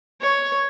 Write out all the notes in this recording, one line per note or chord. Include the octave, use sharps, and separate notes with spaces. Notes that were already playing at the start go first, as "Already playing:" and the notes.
C#5